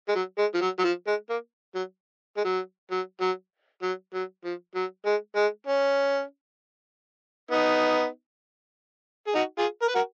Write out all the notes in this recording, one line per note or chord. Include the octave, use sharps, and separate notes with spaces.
G#3
F#3
G#3
F3
F#3
F#3
F3
G#3
A#3
F#3
G#3
F#3
F#3
F#3
F#3
F#3
F3
F#3
G#3
G#3
C#4
B3 D#4
G#4
D#4 F#4
F4 G#4
A#4
B4
F#4 A#4